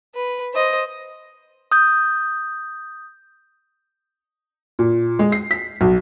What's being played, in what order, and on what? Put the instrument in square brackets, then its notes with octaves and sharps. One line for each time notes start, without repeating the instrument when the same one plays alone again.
[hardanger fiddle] B4
C5 D#5
[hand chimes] D#6 G6
[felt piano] A#2
G#3
C7
B6
B1